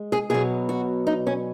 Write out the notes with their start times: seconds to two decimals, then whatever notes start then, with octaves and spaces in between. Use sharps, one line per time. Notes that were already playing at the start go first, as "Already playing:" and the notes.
Already playing: G#3
0.12 G#4
0.30 B2 F#3 G#4
0.69 F#4
1.07 D#4
1.27 C#4